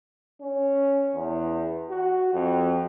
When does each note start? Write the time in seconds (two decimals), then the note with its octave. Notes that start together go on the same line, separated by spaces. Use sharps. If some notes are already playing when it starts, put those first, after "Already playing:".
0.42 C#4
1.15 E2
1.90 F#4
2.34 F2